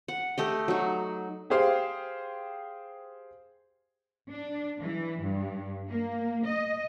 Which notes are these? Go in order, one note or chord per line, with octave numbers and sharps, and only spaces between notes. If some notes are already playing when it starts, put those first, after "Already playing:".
F#5
A3 G4 D#5
F#3 D#4
G4 G#4 C5 F5 G5
D4
E3
G2
A#3
D#5